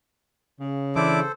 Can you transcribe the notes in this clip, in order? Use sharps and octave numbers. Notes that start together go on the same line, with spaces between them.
C#3
E3 D4 E4 A4 C5 D6